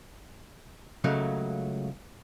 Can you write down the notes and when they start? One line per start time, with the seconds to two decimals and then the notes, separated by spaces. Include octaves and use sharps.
1.04 C#2 C#3 F#3 A3 A#3